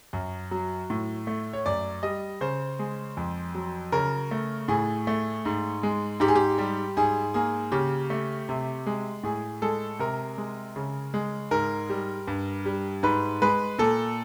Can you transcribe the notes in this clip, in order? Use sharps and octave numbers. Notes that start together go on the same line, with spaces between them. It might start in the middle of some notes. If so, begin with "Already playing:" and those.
F#2
F#3
A2
A3
C#5
F#2 D5
G3 D#5
C#3 C5
G#3
F2
F#3
C#3 A#4
A3
A2 G#4
A3
G#2
G#3
G#2 G4
G#4
G4
G3
G#2 G#4
A#3 G#4
C#3 G4
A3
C3
G#3
A2 G#4
G#3 A4
C3 A#4
G#3
C#3
G#3
G#2 A#4
G3
G2
G3
G#2 B4
G#3 B4
A#2 A4